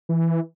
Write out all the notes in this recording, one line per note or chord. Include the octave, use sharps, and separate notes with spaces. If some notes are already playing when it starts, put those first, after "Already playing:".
E3